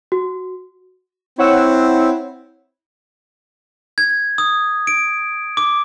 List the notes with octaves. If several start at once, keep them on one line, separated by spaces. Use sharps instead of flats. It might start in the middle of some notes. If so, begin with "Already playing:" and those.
F#4
C4 E4 C#5 F#5 E6
G#6
D#6
D7
D6